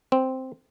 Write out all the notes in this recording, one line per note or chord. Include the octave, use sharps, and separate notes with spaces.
C4